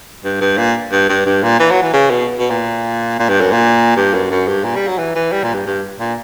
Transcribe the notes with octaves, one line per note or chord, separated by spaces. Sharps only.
G2
G2
A#2
G2
G2
G2
A#2
E3
F#3
E3
C#3
B2
B2
A#2
A#2
G2
F#2
A#2
G2
F#2
F#2
G2
A#2
G3
F#3
E3
E3
G3
A#2
G2
G2
A#2